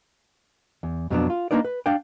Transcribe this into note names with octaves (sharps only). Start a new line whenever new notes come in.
E2
F2 B2 F#3 A3 B3 D4
F4
A#3 D4 D#4 B4 D5
B4
D4 D5 F5 G5